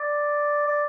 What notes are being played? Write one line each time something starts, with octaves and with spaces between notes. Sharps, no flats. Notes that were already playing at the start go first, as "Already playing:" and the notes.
Already playing: D5
D5